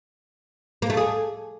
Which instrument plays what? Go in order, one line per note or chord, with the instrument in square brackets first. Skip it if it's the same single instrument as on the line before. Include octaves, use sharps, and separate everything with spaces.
[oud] A#3
A3
G#4